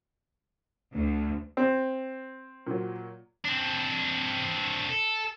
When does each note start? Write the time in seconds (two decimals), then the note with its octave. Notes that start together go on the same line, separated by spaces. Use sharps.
0.94 D2
1.57 C4
2.67 A#2 F#3
3.45 C4 D4
4.90 A4